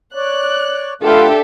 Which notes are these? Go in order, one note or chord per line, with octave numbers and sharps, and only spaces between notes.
C#5 D5 F#6
A3 D4 F4 G4 A4 B4 E5 F#5